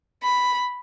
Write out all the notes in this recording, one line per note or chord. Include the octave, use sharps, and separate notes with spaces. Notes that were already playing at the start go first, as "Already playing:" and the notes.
B5